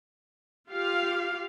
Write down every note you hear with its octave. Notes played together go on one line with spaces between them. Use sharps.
F4 G4 F5